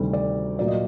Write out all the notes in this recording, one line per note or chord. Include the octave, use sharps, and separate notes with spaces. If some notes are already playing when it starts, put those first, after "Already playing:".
Already playing: D2 C3 D#3 G3 A4
D5
A#2 F#3 A#3 D5
D#5